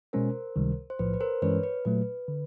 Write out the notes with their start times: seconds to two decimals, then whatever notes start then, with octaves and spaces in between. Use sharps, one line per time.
0.13 B2 G#3 C#4 A#4 C5
0.56 C#2 C3 D#3 G3
0.90 C5
0.99 B1 A2 F3 B4
1.14 B4
1.21 A#4 C5
1.42 G2 E3 G#3 C#4 B4 C#5
1.63 B4
1.85 A#2 F#3 A3 B4
2.28 D3